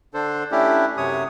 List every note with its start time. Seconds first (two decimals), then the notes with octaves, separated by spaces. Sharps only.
0.14 D3 D4 A4 C5
0.52 A3 C#4 D4 E4 G4
0.97 F#2 C3 C#5 D#6